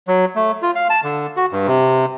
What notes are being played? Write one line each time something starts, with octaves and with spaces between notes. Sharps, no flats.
F#3
A3
F4
F5
A5
D3
F#4
G2
C3